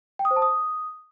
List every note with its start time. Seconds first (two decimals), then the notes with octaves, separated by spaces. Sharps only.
0.19 G5
0.25 D#6
0.31 C5
0.36 A5
0.42 D#6